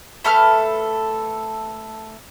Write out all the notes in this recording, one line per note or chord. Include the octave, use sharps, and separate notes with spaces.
A3 A4 B4 F6